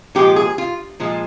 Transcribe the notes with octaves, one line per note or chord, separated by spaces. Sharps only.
A#2 F3 G#3 G4
G#4
F4
A#2 F3 G#3